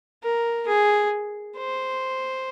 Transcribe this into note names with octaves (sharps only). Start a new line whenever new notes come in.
A#4
G#4
C5